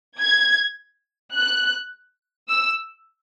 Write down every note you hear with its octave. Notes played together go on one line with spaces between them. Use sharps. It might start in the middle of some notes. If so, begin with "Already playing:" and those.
G#6
F#6
E6